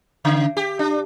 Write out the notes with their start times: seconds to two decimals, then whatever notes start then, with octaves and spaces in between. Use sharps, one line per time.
0.25 C#3
0.57 G4
0.79 D4